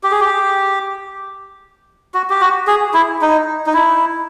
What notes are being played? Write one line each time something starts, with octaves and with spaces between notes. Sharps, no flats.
G4
G#4
G4
F#4
G4
F#4
G#4
E4
D#4
D#4
E4